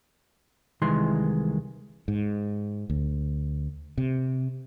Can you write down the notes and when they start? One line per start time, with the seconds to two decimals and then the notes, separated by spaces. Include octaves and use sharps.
0.82 C2 D#3 E3 G#3 C6
2.08 G#2
2.90 D2
3.98 C3